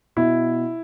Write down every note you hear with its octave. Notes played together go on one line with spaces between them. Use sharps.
B2 E4